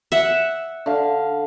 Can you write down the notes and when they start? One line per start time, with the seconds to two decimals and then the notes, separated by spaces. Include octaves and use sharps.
0.12 E5 F#5
0.86 D3 F5